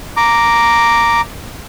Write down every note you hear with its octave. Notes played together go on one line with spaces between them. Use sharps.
A#5 D6